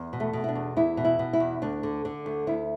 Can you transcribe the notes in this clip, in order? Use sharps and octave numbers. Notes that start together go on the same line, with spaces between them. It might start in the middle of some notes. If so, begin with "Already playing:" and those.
Already playing: E2
B2
A3
B2
E4
D4
E2
E2 E4
B2
E4
B2
E4
E2
D2 D4
D3
D3
D2
D2 E4